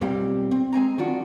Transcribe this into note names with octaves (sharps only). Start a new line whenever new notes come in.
B1 A#2 G3 C4 G4 F5
C4
G#3 C4 G#5 A#5
D#3 F#3 D4 F4 F#4